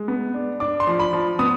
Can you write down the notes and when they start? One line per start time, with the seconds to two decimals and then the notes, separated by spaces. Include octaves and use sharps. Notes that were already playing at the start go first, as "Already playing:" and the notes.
Already playing: G#3
0.08 B3
0.34 D4
0.60 D4 D6
0.80 C6
0.87 F3
1.00 B5
1.13 F3
1.39 B3 D#6